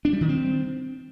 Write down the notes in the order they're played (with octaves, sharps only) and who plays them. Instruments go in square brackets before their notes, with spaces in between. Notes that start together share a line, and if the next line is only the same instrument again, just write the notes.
[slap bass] D4
G3
D#3
C4